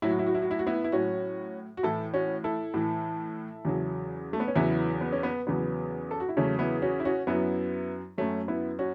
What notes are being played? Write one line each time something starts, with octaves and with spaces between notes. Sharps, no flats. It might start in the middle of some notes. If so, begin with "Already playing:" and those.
A2 F#3 E4
F#4
E4
F#4
E4
F#4
E4
F#4
B3 E4
E4
A2 F#3 C#4 F#4
F#4
A2 E3 E4 A4
C#4 F#4
E4 A4
A2 E3
E2 C#3 F#3
A3
B3
C#4
E2 C#3 F#3 B3 E4
B3
C#4
B3
E2 C#3 F#3 B3
A4
F#4
E4
E2 C#3 F#3 A3 C#4
B3 E4
C#4 F#4
E4
C#4 F#4
F#2 F#3 B3 E4
F#2 F#3 A3 C#4
B3 E4
C#4 F#4